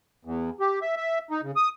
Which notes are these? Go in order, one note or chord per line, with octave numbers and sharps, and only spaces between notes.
E2
G4
E5
E5
D#4
C#3
D#6